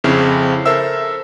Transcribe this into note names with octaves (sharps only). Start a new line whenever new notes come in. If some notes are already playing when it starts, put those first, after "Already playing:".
F2 C#3 C4 C#4 E4
A4 A#4 C5 E5 E6